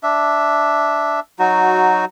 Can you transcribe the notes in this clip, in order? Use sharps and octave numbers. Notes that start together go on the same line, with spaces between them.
D4 E5
F#3 D#4 F#4